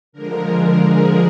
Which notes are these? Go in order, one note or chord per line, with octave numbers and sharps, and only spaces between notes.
D3 F3 G#3 A#4
G#4